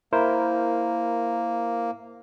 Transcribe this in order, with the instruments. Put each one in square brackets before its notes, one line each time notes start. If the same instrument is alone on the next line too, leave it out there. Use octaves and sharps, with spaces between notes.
[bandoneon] A#3 [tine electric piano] E4 A#4 C5